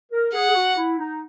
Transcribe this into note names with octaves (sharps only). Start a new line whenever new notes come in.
A#4
G#4 F#5
G#4
F#4
E4
D#4